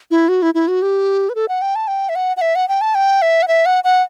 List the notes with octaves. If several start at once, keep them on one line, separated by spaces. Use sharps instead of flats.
E4
F#4
E4
E4
F#4
G4
B4
A4
F#5
G5
A5
G5
E5
F#5
F#5
E5
F#5
G5
A5
G5
E5
F#5
E5
F#5
F#5